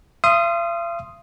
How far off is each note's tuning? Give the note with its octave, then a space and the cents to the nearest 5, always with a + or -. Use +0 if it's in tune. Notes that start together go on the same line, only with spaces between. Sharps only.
F5 -45 C6 +0 D#6 +0